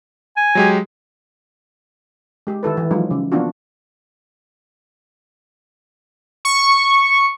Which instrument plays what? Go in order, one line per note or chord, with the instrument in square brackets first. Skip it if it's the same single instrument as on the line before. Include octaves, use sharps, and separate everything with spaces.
[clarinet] G#5
[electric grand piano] F#3 G#3 G4
[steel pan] G#3 G4
D#3 E4 A4 B4
E3
F3 F#3 G#3 D#4 F4
C#3
F3 A#3 B3 D4 F4 F#4
[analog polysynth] C#6